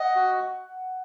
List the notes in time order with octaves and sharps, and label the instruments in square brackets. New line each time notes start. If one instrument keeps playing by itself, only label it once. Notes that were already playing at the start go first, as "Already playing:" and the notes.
Already playing: [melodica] D#5 [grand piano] F#5
[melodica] F#4